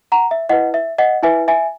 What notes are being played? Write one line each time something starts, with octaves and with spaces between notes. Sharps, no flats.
F#5 A#5
E5
E4 B4 D#5 F#5
E5
D#5 F#5
E4 B4 E5 G#5
E5 G#5